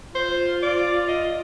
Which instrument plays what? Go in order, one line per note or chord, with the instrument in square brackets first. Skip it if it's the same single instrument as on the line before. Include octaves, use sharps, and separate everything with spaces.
[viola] F4 [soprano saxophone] C5
[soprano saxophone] D5
D#5